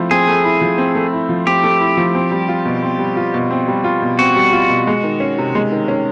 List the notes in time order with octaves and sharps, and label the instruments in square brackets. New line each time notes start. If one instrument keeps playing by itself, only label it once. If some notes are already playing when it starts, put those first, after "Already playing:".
Already playing: [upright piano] F3 A3 C4 E4
[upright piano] C4 [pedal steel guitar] G#4
[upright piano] A3
E4
F3
C4
A3
E4
F3
[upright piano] C4 [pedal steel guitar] G4
[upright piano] A3
E4
F3
C4
G3
F4
B2
C4
G3
F4
B2
C4
G3
F4
B2
[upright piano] C4 [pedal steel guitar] F#4
[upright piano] G3
F4
B2
G#3
D#3
C#4
C3
G#3
D#3
C#4